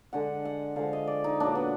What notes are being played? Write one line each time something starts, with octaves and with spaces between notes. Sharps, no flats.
D3 G#3 F#5
F#5
D3 F3 G#3 F5
D#5
D5
D#4
A#2 F#3 D4
B3